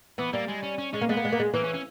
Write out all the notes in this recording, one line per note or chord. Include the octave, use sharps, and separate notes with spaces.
E3 B3
G3 A#3
G#3
C#4
C#4
G#3 C#4
A#3
G#3 B3
A#3
G#3
A#3
G#3
E3 A#3
C#4
C#4